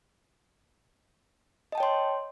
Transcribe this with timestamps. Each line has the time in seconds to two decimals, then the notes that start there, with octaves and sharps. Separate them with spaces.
1.72 D#5
1.75 A5
1.78 G5
1.80 C#5
1.83 C6